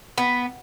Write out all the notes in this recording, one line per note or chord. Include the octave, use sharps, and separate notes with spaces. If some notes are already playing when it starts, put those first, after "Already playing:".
B3